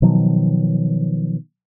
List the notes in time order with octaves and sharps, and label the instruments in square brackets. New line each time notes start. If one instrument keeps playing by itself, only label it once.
[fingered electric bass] B2 D#3 F3 F#3